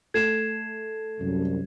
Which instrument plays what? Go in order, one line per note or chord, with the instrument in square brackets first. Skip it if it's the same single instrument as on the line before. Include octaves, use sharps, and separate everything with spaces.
[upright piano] A3 [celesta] G#6 C7 E7
[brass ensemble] C2 F#2